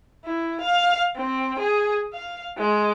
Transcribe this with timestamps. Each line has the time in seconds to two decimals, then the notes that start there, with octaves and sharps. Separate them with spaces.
0.25 E4
0.60 F5
1.16 C4
1.59 G#4
2.13 F5
2.58 G#3